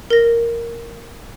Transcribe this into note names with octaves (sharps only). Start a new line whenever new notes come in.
A#4 A#6